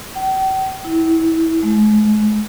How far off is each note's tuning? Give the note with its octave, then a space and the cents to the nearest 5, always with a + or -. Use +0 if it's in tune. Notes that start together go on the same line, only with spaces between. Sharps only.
G5 -45
E4 -20
G#3 +40